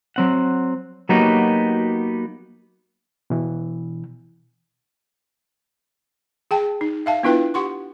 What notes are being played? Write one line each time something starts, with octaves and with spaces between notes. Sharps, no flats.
F#3 C4 F#5
F#3 A#3 B3 D#4 F#4 G4
B2 E3
G#4 G5 A5
D#4
E5 F5 A5
B3 D4 E4 F4 B4 G5
G4 F#5 C6 C#6